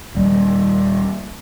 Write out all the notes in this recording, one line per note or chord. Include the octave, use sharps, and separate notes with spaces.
D#1 G3 A#3